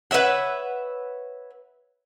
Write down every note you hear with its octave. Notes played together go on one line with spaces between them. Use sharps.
B4 C#5 E5 F#5